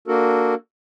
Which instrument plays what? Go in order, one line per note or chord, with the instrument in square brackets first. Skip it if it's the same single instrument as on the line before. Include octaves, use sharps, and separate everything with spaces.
[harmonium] A#3 D4 F#4 A4 A#4